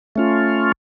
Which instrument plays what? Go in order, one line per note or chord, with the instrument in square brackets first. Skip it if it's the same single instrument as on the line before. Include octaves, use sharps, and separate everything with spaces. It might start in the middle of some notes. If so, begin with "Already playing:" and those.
[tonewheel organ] A3 C#4 F4